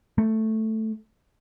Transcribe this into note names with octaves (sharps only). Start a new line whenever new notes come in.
A3